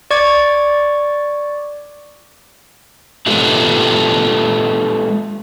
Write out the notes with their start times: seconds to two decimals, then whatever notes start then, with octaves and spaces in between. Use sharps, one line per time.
0.11 D5 C#6 D6 G#6
3.27 G#3 F4 G4 A4 B4 E5